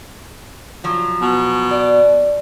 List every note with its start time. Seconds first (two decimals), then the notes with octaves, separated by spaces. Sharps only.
0.84 F3 F#3
1.21 B2
1.71 D5